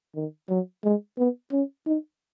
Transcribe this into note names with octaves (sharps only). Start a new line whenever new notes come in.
D#3
F#3
G#3
B3
C#4
D#4